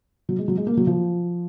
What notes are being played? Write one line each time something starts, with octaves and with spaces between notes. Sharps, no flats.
F#3
G#3
F#3
G#3
A#3
F#3
F3